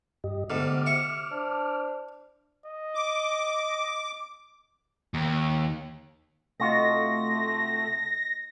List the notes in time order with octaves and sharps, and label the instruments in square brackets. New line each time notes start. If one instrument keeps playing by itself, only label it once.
[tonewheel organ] G2 G4 D#5
[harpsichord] D2 G#2 [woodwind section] C3 B3 [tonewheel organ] D6 F6
[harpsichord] E4 C#6
[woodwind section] D4 C5
[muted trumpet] D#5
[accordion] D6
[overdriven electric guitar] D#2
[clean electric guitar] C3 F4 F#4 [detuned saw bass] A3 [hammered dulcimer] D#4 [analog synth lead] A#6